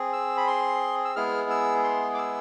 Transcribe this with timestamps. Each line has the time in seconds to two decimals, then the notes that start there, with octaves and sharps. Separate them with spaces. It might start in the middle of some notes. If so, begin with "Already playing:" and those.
Already playing: C4 G#4
0.13 E6
0.37 B5
0.47 C6
1.05 E6
1.16 G#3 B3 E4 G#4 F6
1.50 E6
1.84 C6
2.14 D6
2.18 E6